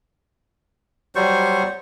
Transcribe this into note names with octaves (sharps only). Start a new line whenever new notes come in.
F#3 G3 C5 C#6